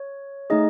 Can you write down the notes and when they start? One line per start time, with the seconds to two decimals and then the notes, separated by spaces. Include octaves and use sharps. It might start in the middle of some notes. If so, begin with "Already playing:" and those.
Already playing: C#5
0.50 A3 D#4 G#4 D#5